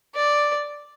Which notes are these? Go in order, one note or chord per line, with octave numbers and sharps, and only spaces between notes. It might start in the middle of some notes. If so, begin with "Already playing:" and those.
D5